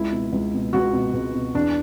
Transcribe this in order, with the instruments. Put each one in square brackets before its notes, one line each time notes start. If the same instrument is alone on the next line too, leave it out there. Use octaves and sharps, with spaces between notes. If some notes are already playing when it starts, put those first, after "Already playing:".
Already playing: [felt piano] C#2 E4
B2
C#2
B2
C#2 F#4
B2
C#2
B2
E2 D4